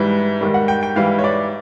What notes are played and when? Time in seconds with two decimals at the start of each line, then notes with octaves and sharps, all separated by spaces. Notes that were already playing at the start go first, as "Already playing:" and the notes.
Already playing: G#2 E3 G3
0.41 G#2 D#3 G3
0.54 F#5
0.68 G5
0.83 G5
0.96 G#2 E3 G3 F5
1.19 C#5
1.24 D5